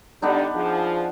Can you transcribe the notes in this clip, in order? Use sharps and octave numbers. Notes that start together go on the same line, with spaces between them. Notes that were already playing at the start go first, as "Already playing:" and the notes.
D3 G3 B3 D4 D#4
F3 G#4